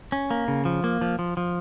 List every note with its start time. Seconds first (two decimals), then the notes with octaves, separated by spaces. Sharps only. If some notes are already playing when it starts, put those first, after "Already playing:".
0.12 C#4
0.31 A#3
0.48 C#3
0.65 F3
0.84 A#3
1.01 F3
1.19 F3
1.37 F3